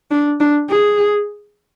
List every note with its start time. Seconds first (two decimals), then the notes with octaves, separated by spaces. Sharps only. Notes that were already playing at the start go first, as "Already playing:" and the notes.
0.11 D4
0.40 D4
0.70 G#4